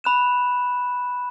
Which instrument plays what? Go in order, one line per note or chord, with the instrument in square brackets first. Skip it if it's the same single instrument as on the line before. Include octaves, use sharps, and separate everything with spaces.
[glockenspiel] B5 F#6 E7